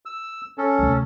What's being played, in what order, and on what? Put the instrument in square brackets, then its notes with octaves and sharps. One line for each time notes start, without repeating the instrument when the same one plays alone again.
[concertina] E6
C#4 A4
[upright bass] D2 C3